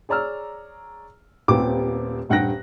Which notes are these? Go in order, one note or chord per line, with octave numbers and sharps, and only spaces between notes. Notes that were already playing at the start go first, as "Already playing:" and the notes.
G#4 C#5 D5 A#5 E6 F6
D#1 A#2 B3 C4 G4 D6
D#1 G2 F#5 G5 F#6 A#6